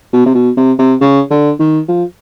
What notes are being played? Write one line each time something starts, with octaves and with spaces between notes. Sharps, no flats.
B2
C3
B2
C3
C3
C#3
D3
D#3
F3